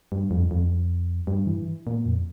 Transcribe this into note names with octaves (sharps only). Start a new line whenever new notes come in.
G2
F2
F2
G2
E3
A#2
F2